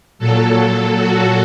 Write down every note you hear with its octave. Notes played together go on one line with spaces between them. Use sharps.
A#2 F#3 A4
F#4